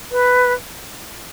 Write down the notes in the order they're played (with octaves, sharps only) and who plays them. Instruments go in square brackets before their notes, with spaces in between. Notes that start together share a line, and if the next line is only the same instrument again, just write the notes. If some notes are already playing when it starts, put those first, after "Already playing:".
[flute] B4